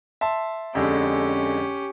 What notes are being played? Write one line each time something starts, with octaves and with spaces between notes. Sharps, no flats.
E5 A5 C6
F2 D3 G#3 C#4 G4